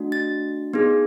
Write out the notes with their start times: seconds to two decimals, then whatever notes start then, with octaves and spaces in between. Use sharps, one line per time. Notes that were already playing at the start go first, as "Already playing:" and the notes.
Already playing: A3 D4 F#4
0.12 A6
0.74 B3 D#4 G#4